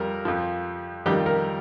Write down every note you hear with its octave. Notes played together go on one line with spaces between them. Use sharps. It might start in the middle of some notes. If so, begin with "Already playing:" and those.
Already playing: F2 G3 A#4
F2 F3
F2 D#3 G3 G4
A#4